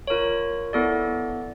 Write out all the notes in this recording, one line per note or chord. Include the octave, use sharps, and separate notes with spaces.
F4 A#4 C#5
B3 E4 A4 D5